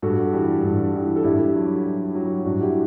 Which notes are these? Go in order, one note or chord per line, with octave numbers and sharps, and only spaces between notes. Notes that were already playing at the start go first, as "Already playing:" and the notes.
G2 F#4 A4
E3 G3
G2
E3 G3
A4
G2 E4 G4
F#3
G2
F#3
G2 D4 F#4
E4 G4